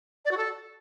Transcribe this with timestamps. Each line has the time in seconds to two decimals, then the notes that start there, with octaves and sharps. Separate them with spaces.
0.25 D5
0.31 F#4
0.37 A4